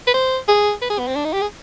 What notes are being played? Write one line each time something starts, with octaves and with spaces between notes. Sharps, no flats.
B4
C5
G#4
B4
G#4
B3
C4
D4
D#4
G4
G#4